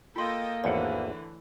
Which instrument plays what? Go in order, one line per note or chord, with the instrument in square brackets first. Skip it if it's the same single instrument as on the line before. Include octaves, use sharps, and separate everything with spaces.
[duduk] A#3 [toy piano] F4 C6 [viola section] A4 D#5 G5
[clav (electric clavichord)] G#1 E2 F#5 [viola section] D3 E3 A3 [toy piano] C#5 D5